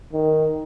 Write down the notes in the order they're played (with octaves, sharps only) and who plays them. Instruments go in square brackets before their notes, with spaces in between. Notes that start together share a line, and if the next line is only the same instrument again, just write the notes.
[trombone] D#3